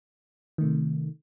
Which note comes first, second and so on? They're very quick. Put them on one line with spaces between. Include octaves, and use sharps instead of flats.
D#3 A3 C3